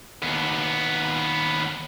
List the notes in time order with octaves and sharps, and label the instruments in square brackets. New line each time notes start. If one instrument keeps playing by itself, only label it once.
[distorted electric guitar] D#2 B3